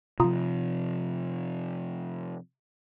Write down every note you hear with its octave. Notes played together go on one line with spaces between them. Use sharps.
C3 F3 F4 A#5 D#6